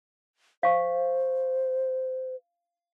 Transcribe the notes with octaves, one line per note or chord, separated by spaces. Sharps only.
C5 F5 C#6